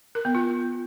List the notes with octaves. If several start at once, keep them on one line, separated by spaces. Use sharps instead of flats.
A#4
B3
F4